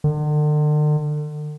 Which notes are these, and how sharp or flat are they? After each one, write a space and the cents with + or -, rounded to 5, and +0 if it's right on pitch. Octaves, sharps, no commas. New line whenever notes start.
D3 +40